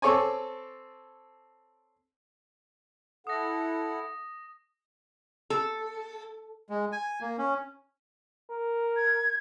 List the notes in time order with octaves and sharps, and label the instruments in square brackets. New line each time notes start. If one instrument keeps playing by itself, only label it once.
[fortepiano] C4 A4 C#5 D5 G#5
[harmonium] E4 A4 F#5 [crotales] D#6 A#6
[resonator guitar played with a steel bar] A4
[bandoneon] G#3
G#5
A#3
C#4
[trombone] A#4
[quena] G#6